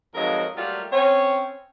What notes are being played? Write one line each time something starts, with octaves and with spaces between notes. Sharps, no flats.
F2 G#2 F#3 A#4 D#5 F5
F#3 G3 A3 A#3 F4
C4 C#4 C#5